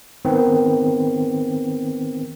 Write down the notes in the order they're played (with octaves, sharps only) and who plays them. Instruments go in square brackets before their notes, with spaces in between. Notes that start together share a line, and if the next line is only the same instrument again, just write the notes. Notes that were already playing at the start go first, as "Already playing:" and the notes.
[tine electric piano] D#3 B3 C4